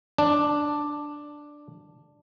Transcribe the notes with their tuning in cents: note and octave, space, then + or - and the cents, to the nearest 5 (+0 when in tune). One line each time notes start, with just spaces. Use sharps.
D4 +5